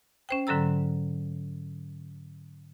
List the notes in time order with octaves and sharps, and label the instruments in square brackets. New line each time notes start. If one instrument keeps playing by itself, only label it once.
[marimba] C#4 C5 G5
G#2 D3 F#3 A4 A#5 E6